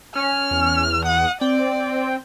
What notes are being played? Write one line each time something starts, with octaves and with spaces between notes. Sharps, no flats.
C#4 F6
E2
F#5 D#6
C4 D5 G5